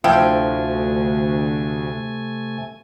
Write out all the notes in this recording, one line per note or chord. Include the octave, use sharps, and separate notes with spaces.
D2 C3 F3 A3 E4 G5 G#5